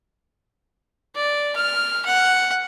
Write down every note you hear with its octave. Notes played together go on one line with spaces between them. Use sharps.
D5
F6
F#5